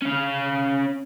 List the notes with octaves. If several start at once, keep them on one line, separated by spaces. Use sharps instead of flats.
C#4 F5